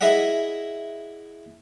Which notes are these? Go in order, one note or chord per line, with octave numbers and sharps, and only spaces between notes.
E4 G#4 D#5 E5 F#5